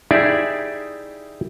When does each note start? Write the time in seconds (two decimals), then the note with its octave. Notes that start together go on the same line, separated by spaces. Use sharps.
0.11 D#4 E4 G4 G#4 D5 E5